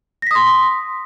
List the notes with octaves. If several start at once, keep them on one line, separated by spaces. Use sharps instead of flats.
C6 D#6 A#6 B6